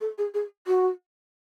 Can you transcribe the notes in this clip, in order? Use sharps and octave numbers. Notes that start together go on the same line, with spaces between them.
A4
G#4
G#4
F#4